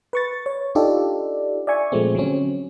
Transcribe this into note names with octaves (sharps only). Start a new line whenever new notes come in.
B4 C#6 A6
C#5
D4 D#4 F4 G4 A4 D5
D5 E5 G#5 C#6
A#2 F3 G#3 A3 C4
D3 F#3 C4 C#4